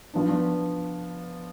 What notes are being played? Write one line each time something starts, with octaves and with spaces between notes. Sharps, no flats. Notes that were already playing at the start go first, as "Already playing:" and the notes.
F3 B3 D4